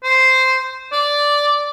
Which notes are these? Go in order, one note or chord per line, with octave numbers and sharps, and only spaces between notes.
C5
D5